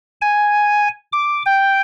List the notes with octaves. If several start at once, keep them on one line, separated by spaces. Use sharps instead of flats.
G#5
D6
G5